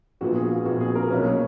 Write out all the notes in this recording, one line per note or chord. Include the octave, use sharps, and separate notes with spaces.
A#1 A#2 F3 B3 F#4
G#4
F4
A#1 A#2 F3 B3 F#4
G#4
A#4
B1 B2 A#3 C#4 B4
C#5